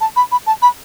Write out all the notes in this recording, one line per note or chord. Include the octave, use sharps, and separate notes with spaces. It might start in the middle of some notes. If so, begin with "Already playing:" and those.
A5
B5
B5
A5
B5